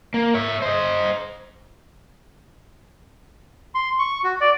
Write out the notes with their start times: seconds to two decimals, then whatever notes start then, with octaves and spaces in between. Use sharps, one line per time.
0.14 A#3
0.34 C#5 E5
0.62 C5 D#5
3.75 C6
3.99 C#6
4.24 F#4
4.41 D5